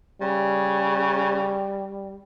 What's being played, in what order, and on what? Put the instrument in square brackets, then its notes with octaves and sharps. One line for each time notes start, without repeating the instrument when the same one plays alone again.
[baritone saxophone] C#3 [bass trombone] G3